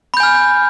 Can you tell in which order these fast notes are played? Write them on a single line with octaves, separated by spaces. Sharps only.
B5 G6 G#5 F6